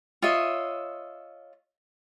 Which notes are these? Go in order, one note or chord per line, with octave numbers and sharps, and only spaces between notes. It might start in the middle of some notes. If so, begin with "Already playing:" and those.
F4 C#5 D#5 E5